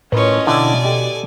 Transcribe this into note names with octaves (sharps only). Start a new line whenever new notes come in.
A2 C#4 F4 A#4 B4 C#5 D#5
B2 D3 E4 D5 G5 G#5
G4 A4 D#5 G5